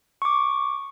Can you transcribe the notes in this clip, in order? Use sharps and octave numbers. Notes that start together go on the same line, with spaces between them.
C#6 D6